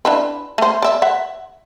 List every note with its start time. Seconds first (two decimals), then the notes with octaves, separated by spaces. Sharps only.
0.05 D4 E4 B4
0.58 A3 C5
0.82 D5 E5
1.02 E5 F#5